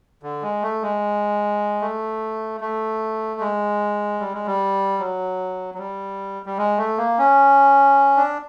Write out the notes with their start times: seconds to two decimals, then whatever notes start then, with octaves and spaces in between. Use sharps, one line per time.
0.23 D3
0.42 G#3
0.62 A3
0.82 G#3
1.81 A3
2.61 A3
3.40 G#3
4.20 G3
4.33 G#3
4.46 G3
4.99 F#3
5.74 F#3
5.79 G3
6.46 G3
6.58 G#3
6.78 A3
6.98 A#3
7.18 C#4
8.17 D4